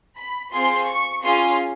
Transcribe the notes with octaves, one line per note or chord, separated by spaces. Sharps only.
B5
C4 F4 G#4 C6
C#6
C#4 F4 G#4 C6